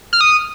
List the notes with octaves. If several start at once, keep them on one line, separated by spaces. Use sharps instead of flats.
F6
D#6